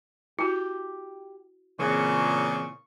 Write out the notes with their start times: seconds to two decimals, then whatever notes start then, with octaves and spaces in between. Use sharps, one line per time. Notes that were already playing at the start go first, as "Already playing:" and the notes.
0.39 E4 F#4 G4
1.79 A#2 C#3 E3 C4 C#6